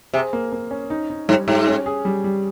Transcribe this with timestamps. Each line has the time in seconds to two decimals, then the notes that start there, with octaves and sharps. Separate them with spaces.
0.13 C3 G#4
0.33 A#3
0.52 A#3
0.71 C#4
0.90 D#4
1.10 D#4
1.28 G#2 G3
1.48 G#2 G4
1.67 C#4
1.86 G#4
2.05 G3
2.24 G3